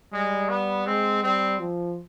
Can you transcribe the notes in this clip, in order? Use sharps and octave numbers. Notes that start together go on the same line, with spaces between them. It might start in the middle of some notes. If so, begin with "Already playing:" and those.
G3 G#3
B3
G#3 C4
G3 C4
F3